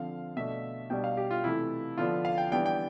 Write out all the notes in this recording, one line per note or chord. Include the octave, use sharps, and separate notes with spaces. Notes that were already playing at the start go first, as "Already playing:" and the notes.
Already playing: D3 F3 C4 F5
B2 A3 D4 E5
B2 G3 D4 G5
F5
G4
F4
C3 E3 A3 E4
D3 F3 B3 D4 F4
F5
G5
E3 G3 B3 D4 G5
G5